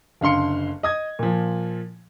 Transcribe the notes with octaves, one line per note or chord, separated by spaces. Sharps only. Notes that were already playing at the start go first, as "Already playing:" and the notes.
F#1 D3 F5 C6 C#7
D#5 D#6 G#6
A#2 F3